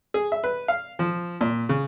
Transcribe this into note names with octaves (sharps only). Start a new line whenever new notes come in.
G#4
E5
B4
F5
F3
A#2
C#3